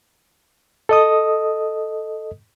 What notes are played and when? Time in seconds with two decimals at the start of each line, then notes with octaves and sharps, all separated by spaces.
0.89 A4 D#5 D#6